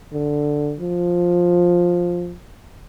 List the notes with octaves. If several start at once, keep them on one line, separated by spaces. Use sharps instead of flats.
D3
F3